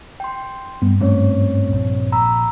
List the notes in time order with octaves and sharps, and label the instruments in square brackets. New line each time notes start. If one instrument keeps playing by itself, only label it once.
[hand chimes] G5 C6
[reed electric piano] G2 [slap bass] B3
[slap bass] G#2 A3 C#4 [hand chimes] C4 C#5
[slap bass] A#1
[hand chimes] A#5 B5 E6